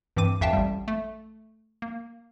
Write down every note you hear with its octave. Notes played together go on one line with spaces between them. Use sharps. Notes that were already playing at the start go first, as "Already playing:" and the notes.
G2 E3 C4 D6 D#7
A1 F2 E5 F5 G5 A5
A1 G3
A3
A#3